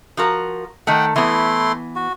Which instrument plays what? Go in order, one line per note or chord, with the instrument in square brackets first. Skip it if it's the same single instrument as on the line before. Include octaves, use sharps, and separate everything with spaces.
[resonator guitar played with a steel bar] F3 F#4 A#4
[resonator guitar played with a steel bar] D#3 A3 [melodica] F#5 G5
[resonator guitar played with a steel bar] E3 B3 [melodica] A3 E4 C6
[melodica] F#4